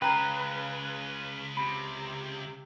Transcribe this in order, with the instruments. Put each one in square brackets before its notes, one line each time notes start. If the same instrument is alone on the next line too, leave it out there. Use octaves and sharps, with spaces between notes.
[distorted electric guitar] C#2 [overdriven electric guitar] C#3 [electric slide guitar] B4 [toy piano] G5 A#5
[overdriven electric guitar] C3 [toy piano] B5